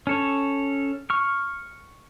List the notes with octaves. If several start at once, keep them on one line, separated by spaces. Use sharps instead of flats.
C#4 A4 C#5
C#6 F6